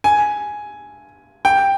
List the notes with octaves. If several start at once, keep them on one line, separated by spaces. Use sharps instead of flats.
G#5
G5